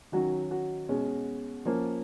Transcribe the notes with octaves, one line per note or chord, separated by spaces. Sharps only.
D#3 F#3 C#4 F#4
F#4
B2 G#3 C#4
F3 A#3 C#4